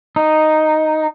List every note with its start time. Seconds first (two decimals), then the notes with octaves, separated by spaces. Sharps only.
0.16 D#4